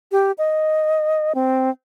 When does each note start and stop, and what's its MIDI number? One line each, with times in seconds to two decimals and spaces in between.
0.12 0.32 67
0.38 1.33 75
1.35 1.70 60